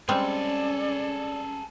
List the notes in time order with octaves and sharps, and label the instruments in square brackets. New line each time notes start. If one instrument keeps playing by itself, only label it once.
[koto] G3 G#3 C4 [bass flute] C#4 [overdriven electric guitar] G#4 A4 [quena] D5